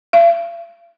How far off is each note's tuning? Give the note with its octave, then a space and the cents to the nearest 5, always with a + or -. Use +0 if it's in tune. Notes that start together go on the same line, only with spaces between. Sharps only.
F5 -45